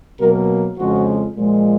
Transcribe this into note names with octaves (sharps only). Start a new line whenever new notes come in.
B2 F#3 A#3 A#4
F2 C#3 F3 G#3 F#4
A#2 F3 G#3